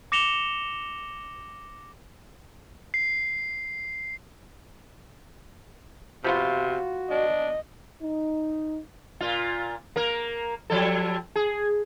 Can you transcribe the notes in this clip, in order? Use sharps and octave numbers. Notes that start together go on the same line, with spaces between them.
D6 A#6 C#7 E7 F7 G7
C7
C3 F3 B3 F4 F#4
D4 D#5
D#4
A#2 F4
A#3 A#4
F3 G3 A4
G#4